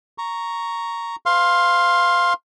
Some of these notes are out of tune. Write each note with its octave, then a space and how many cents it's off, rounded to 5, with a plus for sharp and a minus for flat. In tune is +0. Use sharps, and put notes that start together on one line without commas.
A#5 +0 C#6 +5
B4 +10 F5 +0 C6 +20